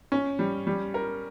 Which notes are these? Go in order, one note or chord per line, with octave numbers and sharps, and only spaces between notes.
C#4
G3
G3
A#4